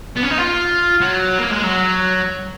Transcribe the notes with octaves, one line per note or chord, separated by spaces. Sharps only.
B3
C#4
D#4
F4
F#3
A#3
G#3
F#3